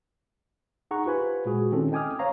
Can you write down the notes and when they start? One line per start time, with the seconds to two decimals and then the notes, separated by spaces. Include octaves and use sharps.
0.91 D#4 G#4 F#5 A#5 C#6
1.06 F4 G4 B4 C5 G#5 B5
1.46 A#2 G#3 F#4 G#4
1.72 D#3 C4 C#4 E4 A4
1.92 D#5 G5 G#5 D6 D#6 F6
2.19 C5 C#5 F5 A#5